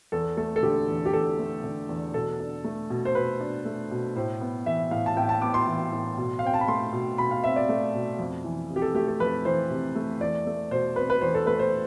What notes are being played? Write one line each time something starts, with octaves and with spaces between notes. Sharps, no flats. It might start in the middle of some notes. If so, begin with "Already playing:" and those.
E2 A4
A3 A4
A4
D3 G4
E2
G4
E2 A4
A3
D3
E2
B2 A4
D4
A3
B2
C5
B2 B4
D4
A3
B2
A2 C5
B3
E3 E5
A2 F5
A5
A2 G5
A5
B3 D6
C6
E3
A2
B2
F5
C4 G5
A5
B5
A3 C6
B2
B2 B5
F5
C4 E5
D5
A3
B2
F2
E3
C3
G4
A4
A3 G4
A4
F2 B4
E3 C5
C3
A3
E2 D5
A3
B2 C5
C4 B4
B4
E2 C5
A4
A3 B4
C5